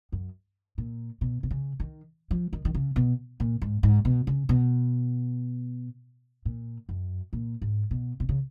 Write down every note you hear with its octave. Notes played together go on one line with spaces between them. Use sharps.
F#2
A#2
B2
B2
C#3
D#3
F3
D#3
D#3
C#3
B2
A#2
G#2
G#2
B2
C#3
B2
A#2
F#2
A#2
G#2
B2
B2
C#3